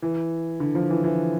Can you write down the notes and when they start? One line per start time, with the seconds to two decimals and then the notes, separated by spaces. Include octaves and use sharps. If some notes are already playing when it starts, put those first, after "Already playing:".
0.02 E3
0.60 D3
0.75 F3
0.89 E3
1.04 E3